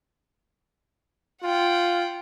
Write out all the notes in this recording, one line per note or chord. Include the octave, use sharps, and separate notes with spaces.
F4 F#5 G5